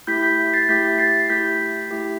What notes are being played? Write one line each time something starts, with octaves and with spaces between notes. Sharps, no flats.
A3 E4 G4 G6 B6
G6 B6
A6 C7
A3 E4 G4 G6 B6
A6 C7
C7
A3 E4 G4 G6 B6
A3 E4 G4